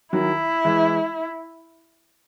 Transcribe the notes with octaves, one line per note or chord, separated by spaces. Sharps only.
D#3 F#3 E4
E3 G#3